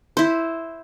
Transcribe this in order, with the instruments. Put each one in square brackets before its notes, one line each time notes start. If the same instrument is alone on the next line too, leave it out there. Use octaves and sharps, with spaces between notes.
[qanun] E4 C5